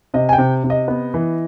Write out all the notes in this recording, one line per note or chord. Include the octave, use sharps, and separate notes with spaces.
C3 D#5
G#5
G5
C3
C3
D#5
B3
E3